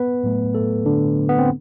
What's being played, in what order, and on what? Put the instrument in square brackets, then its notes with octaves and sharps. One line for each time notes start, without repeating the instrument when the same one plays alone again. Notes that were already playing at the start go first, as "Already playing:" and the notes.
Already playing: [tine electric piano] B3 B4
A2 F#3 A3
A3 A4
D3 D4
B3
C4